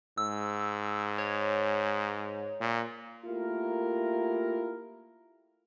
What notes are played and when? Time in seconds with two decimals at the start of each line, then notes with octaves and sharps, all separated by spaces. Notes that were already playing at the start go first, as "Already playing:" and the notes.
0.18 G#2 E6
1.18 C#5
2.60 A#2
3.26 A3 A#3 E4 F4 G4 A#4